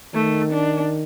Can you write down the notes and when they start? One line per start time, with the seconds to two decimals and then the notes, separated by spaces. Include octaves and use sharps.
0.14 D#3 A3
0.53 D4